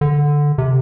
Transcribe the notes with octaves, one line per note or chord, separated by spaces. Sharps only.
D3
C3